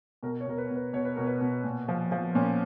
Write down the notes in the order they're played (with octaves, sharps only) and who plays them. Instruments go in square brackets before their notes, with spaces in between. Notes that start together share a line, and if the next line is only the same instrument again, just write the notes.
[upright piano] B2 A#4
C#5
B2 A#4
B4
B2
B4
B2 C#5
B4
B2 A#4
B4
B2
A#2
F3
F3
A#2 C#4